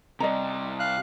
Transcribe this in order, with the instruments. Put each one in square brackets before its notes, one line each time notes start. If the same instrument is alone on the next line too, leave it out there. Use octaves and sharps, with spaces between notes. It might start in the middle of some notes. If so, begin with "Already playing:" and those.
[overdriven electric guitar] C3 G3 [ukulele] D5 D#5 A#5
[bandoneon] F5 F#6